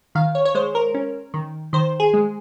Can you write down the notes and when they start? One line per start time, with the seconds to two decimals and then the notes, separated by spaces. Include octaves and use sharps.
0.15 D#3 F5
0.35 C#5
0.45 C#5
0.55 G#3 C5
0.75 A#4
0.94 C#4
1.34 D#3
1.73 D#3 C5
2.00 G#4
2.13 G#3